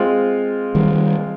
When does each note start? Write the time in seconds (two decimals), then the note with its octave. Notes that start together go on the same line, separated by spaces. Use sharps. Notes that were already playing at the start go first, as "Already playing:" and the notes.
Already playing: G#3 C4 F4
0.75 D#3 G3